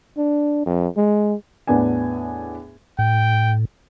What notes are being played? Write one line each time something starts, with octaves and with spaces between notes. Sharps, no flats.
D4
F2
G#3
E2 A2 B3 D4 G#5
A2 G5